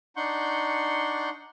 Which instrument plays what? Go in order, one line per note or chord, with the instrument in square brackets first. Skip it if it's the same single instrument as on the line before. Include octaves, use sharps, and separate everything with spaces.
[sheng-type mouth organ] D4 D#4 F#5 C6 C#6 G6